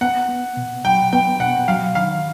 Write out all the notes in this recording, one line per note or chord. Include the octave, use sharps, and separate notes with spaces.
B3 F#5
B3
B2
F#3 G5
B3 G5
B2 F#5
F#3 F5
D#3 F5